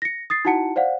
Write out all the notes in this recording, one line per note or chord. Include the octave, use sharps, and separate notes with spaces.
A#6 C#7
D#6 A6 C7
D#4 E4 F#4 F#5 A5 C#7
C5 D5 F5 F#5